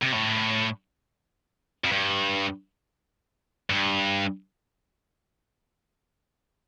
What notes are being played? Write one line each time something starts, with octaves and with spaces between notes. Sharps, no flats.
C3
A2
F2
G2
G2